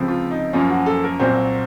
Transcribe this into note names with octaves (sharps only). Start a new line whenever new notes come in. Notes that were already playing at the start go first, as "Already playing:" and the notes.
Already playing: C#2 C3 F3 C4
F4
D#4
F#2 F3 A#3 C#4 F4
F#4
A4
A#4
C2 A#2 F#3 C4 C5